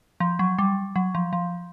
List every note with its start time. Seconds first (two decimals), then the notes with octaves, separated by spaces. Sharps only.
0.20 F3
0.39 F#3
0.58 G3
0.96 F#3
1.15 F3
1.33 F3